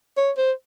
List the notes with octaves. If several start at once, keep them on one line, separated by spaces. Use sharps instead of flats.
C#5
C5